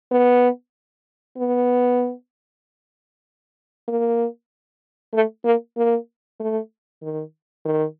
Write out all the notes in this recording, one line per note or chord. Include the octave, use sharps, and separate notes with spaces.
B3
B3
A#3
A3
A#3
A#3
A3
D#3
D#3